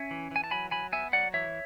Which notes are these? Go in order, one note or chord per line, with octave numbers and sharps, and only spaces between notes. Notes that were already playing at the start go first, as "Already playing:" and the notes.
Already playing: C#4 E5 G#5
E3
E3 G#5
A5
F#3 G#5 B5
F#3 G#5 B5
B3 E5 G#5
F#3 D5 F#5
E3 C#5 E5